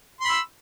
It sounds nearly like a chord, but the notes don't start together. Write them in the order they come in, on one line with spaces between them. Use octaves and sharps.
C6 B5 E6